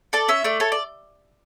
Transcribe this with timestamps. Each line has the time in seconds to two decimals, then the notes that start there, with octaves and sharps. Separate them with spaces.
0.13 A4 D5
0.28 C#4 E5
0.44 A3 D5
0.60 A4 C#5
0.72 D5